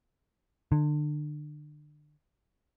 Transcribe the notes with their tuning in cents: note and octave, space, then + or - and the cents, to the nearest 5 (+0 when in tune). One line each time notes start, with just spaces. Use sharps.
D3 +30